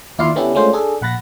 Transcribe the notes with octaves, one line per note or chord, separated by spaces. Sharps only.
D#2 E4 F4 D5 F5 C6
D3 B3 C#4 D4 E4 G4
G#3 A3 C#4 D4 F4 C5
D4 G#4 A4
A#1 F#5 B5 A6 A#6